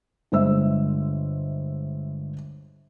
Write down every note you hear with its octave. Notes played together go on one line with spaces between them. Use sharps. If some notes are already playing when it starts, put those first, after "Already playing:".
G1 G#3 C5 E5 E6